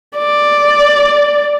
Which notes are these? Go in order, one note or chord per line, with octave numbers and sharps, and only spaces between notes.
D5